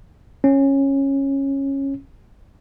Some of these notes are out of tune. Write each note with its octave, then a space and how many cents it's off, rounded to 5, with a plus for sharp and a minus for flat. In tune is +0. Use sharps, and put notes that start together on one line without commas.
C#4 -15